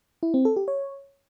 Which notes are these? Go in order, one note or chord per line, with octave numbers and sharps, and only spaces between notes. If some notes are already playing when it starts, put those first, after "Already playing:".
E4
C4
A4
G4
C#5